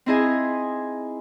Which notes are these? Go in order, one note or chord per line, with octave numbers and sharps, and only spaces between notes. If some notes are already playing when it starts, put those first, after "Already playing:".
C4 D#4 E4 G#4 D#5 G#5